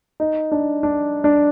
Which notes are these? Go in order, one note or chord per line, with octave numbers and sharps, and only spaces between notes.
D#4
D4
D4
D4